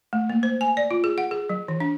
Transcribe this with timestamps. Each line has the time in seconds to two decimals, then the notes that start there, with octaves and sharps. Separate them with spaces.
0.13 A3
0.30 A#3
0.43 C5
0.61 G#5
0.77 D5
0.91 F4
1.04 G#4
1.18 F#5
1.31 G#4
1.49 F#3
1.68 E3
1.80 D4